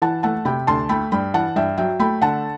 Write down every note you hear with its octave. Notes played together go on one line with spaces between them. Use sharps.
E3 F#5 A5
A3 F#5 A5
C3 G5 B5
D2 A5 C6
A3 G5 B5
G2 G5 B5
E3 F#5 A5
G2 E5 G5
F#3 E5 G5
A3 G5 B5
D3 F#5 A5